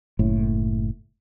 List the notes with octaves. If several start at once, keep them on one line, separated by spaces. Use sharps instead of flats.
F#1 A2